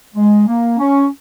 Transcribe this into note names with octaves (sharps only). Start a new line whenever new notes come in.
G#3
A#3
C#4